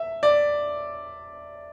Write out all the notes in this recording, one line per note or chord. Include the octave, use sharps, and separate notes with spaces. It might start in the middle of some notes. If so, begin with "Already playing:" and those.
Already playing: E5
D5